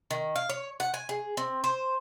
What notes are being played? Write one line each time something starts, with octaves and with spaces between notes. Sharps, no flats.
D#3
F5
C#5
F#5
G#5
G#4
C4
C5